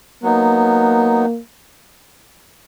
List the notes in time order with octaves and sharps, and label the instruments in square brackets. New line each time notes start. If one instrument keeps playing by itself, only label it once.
[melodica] F#3 B3 D#4 [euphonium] A#3